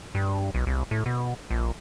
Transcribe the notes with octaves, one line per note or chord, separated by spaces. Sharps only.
G2
B1
C2
A2
B2
A#1